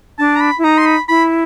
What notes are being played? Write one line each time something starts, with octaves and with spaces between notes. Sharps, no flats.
D4 A5
A#5
B5
E4
D#4 A#5
C6
B5
E4 B5